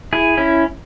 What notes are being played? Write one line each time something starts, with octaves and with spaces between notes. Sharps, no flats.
E4 G#4
C#4 E4